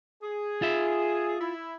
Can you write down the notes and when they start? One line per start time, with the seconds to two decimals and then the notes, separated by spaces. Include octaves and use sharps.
0.23 G#4
0.62 F4 E5
1.40 E4